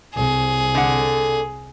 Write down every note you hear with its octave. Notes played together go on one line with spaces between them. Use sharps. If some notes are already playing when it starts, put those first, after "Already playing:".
C2 G#4
D3 F#5